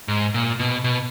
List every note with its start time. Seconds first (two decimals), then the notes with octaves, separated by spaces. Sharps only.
0.08 G#2
0.34 A#2
0.59 B2
0.84 B2